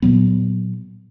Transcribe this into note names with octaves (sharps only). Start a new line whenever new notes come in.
A#2 F#3 B3